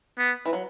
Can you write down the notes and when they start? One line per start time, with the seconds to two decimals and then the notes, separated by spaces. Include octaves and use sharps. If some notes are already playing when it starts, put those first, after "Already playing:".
0.18 B3
0.46 E3
0.53 F#3